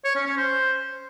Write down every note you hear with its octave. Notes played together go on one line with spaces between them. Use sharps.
C#5
C#4
C#4
C5